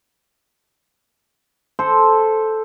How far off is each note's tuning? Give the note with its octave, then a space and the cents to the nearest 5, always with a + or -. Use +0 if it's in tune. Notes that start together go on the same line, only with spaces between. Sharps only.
A4 -5 C5 +0